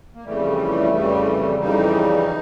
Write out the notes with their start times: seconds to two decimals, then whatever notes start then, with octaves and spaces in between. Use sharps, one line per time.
0.14 A#3
0.25 F2 C#3 E3 G3 A3
0.93 F2 C#3 E3 G3
1.60 F2 C#3 E3 G3 D#4